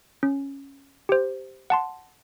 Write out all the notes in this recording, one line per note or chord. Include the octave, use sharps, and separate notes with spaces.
C#4
G4 C5
F#5 A5 C6